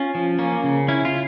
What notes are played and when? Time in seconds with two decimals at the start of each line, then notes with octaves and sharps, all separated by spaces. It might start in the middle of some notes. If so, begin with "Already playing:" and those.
Already playing: C#4 F4
0.15 F3
0.39 A#3 C#4
0.64 C#3
0.88 C#4 E4
1.05 F4